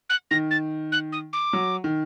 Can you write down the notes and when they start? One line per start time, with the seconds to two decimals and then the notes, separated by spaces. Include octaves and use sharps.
0.10 F#6
0.31 D#3 A#6
0.51 A6
0.92 F#6
1.12 D#6
1.33 D6
1.53 F#3
1.84 D#3